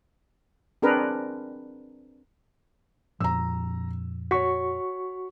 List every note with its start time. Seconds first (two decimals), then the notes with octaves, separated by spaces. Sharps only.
0.82 C4 D4 G#4 A#4 B4
3.20 F2 A#2 F3 A#5 E6
4.31 F#4 C#5 C#6 B6